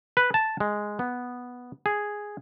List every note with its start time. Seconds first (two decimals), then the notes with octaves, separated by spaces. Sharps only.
0.17 B4
0.34 A5
0.60 G#3
0.99 B3
1.86 G#4